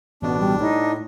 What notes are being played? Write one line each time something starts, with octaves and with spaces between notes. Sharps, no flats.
A1 B2 B3 D4
G3
A2 D#4 E4